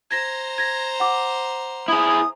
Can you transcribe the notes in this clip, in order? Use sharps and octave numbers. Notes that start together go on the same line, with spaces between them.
C5 A#5 G#6 A#6
G#6 A#6
F#5 D6
E4 G#4 D#6